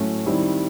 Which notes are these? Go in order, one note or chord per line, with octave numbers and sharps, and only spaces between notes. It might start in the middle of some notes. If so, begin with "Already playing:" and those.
Already playing: A2 F#3 A3 C#4
D#3 G3 C4 E4